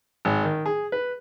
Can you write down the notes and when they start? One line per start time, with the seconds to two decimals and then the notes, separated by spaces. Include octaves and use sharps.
0.25 G#1
0.44 D#3
0.66 G#4
0.92 B4